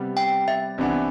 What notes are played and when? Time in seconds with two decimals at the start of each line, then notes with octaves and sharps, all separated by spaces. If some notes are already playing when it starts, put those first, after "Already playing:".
Already playing: C3 G3 B3
0.17 G5
0.48 E5
0.78 C2 C3 E3 B3 D4